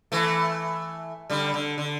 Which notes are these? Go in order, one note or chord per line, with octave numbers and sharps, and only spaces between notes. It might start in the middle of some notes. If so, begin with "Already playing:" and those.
E3 A3
D3 G3
D3
D3